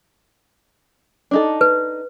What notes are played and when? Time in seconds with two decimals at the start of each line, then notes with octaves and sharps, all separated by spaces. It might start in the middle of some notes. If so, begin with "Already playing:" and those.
1.31 D4 D#4 A4
1.61 B4